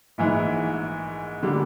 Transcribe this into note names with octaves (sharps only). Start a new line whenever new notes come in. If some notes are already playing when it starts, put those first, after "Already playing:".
A#1 G#2 E3
D3 G3 A#3